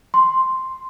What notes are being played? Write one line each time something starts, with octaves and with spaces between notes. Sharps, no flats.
C6